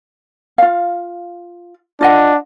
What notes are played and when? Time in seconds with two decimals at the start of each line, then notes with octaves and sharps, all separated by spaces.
0.58 F4 F5
2.01 D4 F4 D#5 F#5